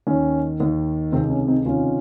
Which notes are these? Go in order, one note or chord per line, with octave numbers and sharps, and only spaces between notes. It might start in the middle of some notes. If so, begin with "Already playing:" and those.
D#2 D#3 C#4
D#2 D#3
C#2 C3 D#3 C4
C#4
C4 D#4
C#2 C3 D#3 C#4 F4